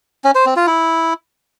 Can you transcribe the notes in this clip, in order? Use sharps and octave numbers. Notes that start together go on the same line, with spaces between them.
C#4
C5
C4
F4
E4